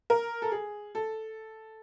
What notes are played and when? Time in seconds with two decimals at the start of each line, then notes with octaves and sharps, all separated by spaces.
0.10 A#4
0.42 A4
0.52 G#4
0.95 A4